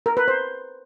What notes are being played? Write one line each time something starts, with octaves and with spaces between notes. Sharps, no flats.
A#4
B4
C5